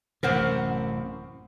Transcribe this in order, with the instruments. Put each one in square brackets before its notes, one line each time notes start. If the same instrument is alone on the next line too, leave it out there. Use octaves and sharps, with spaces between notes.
[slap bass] A1 F#2 C3 [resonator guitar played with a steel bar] A#4 C5 F#5